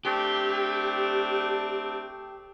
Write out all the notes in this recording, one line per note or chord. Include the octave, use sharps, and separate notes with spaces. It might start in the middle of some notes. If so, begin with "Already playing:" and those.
A3 C4 D4 G4